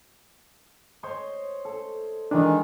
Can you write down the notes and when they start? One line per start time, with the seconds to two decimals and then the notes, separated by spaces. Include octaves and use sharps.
1.03 C5 C#5 D#5
1.65 A4
2.31 D#3 E3 G#3 D4